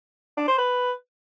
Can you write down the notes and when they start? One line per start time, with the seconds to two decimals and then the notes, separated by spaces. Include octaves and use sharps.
0.37 D4
0.48 C5
0.58 B4